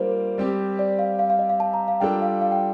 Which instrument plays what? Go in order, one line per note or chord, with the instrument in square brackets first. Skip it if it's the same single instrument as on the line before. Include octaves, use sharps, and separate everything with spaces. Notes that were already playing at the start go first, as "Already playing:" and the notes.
Already playing: [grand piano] G3 A#3 D4 F4 [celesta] A#4 C5
[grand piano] G3 C4 G4
[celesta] D5
F5
F5
F5
D#5
F5
A5
A#5
F5
[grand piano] G3 D4 F4 A4 [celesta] G5
[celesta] F5
F5
G5